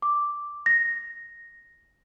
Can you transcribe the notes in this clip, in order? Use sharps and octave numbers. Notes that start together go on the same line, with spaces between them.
D6
A#6